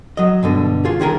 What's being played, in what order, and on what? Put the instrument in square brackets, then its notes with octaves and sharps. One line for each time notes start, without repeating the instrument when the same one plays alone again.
[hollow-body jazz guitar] F#3 D#5
G2 B2 D3
F4 G#4
C2 D#3 G#4 A#4